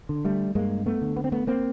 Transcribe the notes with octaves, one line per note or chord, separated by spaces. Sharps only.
D3
G3 A3
G2 G#3 A#3
A3 B3
D3
B3
C4
A3 B3
A#3 C4